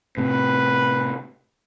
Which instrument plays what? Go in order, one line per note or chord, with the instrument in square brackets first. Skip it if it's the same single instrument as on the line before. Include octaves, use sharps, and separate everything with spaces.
[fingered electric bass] A2 C3 [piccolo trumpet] B4